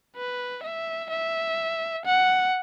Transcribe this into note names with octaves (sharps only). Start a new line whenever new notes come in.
B4
E5
E5
F#5